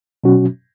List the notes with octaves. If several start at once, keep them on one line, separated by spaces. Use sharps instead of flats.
B2 F#3 C#4 F#4